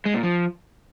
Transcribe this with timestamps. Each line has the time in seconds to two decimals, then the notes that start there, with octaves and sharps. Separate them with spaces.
0.06 G#3
0.14 A#2
0.23 F3